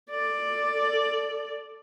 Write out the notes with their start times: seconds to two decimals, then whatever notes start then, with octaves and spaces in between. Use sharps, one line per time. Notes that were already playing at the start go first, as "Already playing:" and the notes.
0.10 A4 D5